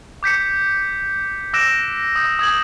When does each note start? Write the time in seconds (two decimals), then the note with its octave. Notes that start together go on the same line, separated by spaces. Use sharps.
0.23 D6 G6 B6 C#7
1.53 D6 E6 F#6 A#6 D7 E7
2.16 D#6 G6
2.39 D#6 G#6 F#7